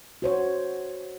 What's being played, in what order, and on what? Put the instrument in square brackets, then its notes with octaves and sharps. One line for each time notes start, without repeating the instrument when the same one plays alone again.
[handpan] F#4 C5 C#5